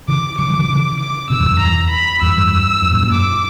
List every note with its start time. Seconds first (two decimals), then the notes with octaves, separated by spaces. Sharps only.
0.08 C#3 E3 D6
0.38 D3 F#3 D6
0.48 E3 G3
0.59 D3 F#3
0.69 C#3 E3
1.00 D6
1.30 B2 D3 E6
1.40 E2 G2
1.51 F#2
1.60 E2 A#5
1.90 B5
2.21 E2 G2 E6
2.36 E2 G2
2.82 F#2
2.92 F#2 A#2
3.02 F#2 A#2
3.12 D6